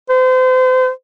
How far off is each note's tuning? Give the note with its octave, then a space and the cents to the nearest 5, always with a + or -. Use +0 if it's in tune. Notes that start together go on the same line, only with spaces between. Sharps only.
C5 -35